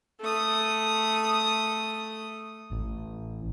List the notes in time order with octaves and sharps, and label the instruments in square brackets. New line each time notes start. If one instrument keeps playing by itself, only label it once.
[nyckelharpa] A3 D#6
[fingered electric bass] A1